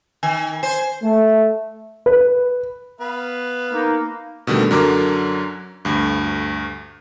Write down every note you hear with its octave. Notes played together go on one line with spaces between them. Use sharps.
D#3 G#5
C5 G#5
A3
B4
B3 B4 F5
A#3 D#4
B2 D3 D#3 G3 A3
F#2 D3 F#3 A#4 A#5 D6
D2 G2